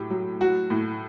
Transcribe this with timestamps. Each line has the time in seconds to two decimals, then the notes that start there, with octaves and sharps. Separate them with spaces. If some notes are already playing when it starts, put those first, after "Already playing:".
Already playing: A2 F#3 G4
0.10 F#3
0.40 F#3 F#4
0.70 A2